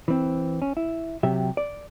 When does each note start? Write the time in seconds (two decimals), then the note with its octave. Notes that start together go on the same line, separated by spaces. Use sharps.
0.08 E3 C4
0.62 C#4
0.77 E4
1.23 C3 F#3 G4 E5
1.57 D5